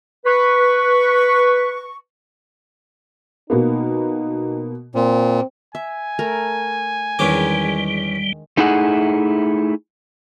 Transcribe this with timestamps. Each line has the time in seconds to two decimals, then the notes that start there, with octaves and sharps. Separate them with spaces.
0.25 B4 C#6
3.50 B2 A#3 B3 D#4
4.95 A#2 C4
5.75 E5 G#5
6.19 A3 A#4
7.19 E2 D#3 G3 G#3 C#4 D4 D6
8.57 A3 D#4 E4 G#4 F#5